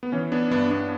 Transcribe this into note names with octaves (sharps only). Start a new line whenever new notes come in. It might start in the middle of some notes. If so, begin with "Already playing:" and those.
B3
E3 C#4
B3 D4
G2 B3 D4
B3 D4